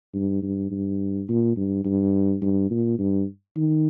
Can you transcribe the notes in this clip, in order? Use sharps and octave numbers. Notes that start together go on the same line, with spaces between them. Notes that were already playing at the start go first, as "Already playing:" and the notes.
G2
G2
G2
A#2
G2
G2
G2
A#2
G2
D#3